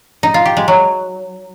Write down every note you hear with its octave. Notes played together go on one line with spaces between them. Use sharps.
D#4
F4
G4
G#3
F#3